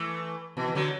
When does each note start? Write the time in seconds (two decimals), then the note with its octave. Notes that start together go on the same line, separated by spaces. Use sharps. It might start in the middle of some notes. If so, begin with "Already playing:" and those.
Already playing: E3 A3
0.57 B2 E3
0.68 E3
0.75 D3 F#3